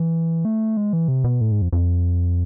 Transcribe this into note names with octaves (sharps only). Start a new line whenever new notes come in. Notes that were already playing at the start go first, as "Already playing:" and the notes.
Already playing: E3
A3
G#3
E3
C3
B2
A2
G#2
F2
F2